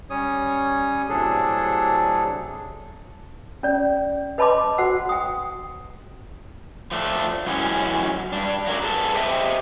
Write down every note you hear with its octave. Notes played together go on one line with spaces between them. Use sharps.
G3 C#4 C#5 D#6
A2 C3 F#3 D4 G#4 A4
C#4 D5
B4 D#5 A5 B5 C6 D6
F#4 C5 F#5 E6
G5 D#6
F3 A3 D4
F#2 A2 E3 F#3 G#3 C#4
G2 D4
F#3 A#4 D5
G#4 A4 B4 F5 A5
G4 C5 D#5 E5 G5